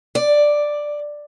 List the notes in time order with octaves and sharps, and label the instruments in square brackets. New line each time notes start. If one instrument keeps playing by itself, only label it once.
[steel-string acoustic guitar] D5